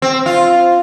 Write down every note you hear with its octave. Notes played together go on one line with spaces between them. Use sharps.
C4
F4